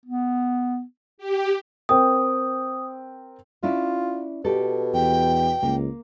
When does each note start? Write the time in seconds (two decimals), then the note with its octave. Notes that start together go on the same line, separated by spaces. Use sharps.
0.06 B3
1.18 G4
1.89 C4 A#4 G5 D#6
3.63 C#4 D4 E4 F4
4.45 B2 G4 A4
4.94 E2 G5
5.63 C#2 A#3